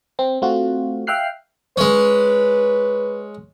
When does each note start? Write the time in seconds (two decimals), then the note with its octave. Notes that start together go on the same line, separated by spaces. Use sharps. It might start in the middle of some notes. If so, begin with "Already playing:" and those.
0.19 C4
0.42 A3 C4 F4 F#4
1.07 E5 F5 G5 F6 F#6 C7
1.77 G#3 C#4 B4